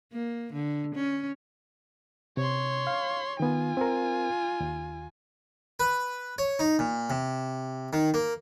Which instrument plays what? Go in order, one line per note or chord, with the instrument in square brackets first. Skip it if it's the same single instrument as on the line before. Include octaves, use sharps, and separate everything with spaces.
[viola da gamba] A#3
D3
C#4
[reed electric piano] C3 [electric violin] C#5 C6
[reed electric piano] F5
[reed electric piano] D#3 B3 [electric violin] F4 G#5
[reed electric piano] C4 A#4
D#2
[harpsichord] B4
C#5
D#4
A#2
C3
D#3
A#3